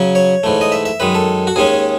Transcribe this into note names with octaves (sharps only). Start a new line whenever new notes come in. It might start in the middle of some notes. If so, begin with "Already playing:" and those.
Already playing: C#3 F#3 C#4
C#5
G#2 E3 A3
D#5
E5
E5
F#2 D#3 G#3 B4
A4
F#4
D#2 D#3 G#3 C#4 G#4